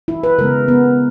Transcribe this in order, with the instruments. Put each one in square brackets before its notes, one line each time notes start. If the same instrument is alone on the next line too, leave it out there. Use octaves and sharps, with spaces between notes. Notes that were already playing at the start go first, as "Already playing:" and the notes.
[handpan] E4
B4
C#3 G#3 B3 A#4
B3